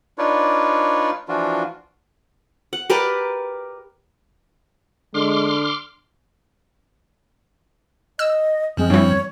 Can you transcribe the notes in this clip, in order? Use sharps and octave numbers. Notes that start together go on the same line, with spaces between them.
D4 D#4 F4 B4 C#5 D5
E3 F3 D4 F4 F#4
F#5
G4 A#4 B4 D5
D3 G#3 C6 D6 F6
D#5 E6
F#2 F3 G#3 C4
G2 E3 C#5